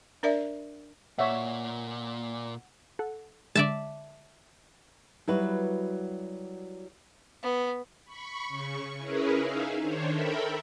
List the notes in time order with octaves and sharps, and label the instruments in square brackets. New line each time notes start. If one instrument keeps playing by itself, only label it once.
[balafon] D4 A#4 D5 E5
[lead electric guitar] A#2 [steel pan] C#5 E5 [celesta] F#5
[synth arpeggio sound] A4 F#5
[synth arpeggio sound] D3 G#3 [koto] D5 E5 A5
[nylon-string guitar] F#3 G3 E4 F#4 B4
[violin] B3
[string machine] B5 C#6
C#3 C#6
C#4 E4 G#4 A#4 B4
D#4 G#4 E5 F5
D#3 D4 C5 C#5
A4 A#4 E5 G5 B5